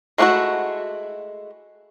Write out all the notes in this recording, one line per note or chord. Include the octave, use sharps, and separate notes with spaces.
G#3 A3 D4 E4 F#4